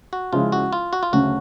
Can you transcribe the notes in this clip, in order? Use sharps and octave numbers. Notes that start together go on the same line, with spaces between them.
F#4
C#3 F3 G#3 C#4 E4 F4
F#4
F4
F#4
F4
D2 C#3 F#3 A3 C#4 F#4